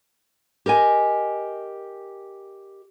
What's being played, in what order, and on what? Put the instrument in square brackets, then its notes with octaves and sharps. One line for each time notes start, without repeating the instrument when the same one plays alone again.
[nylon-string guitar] G4 A#4 D#5 G#5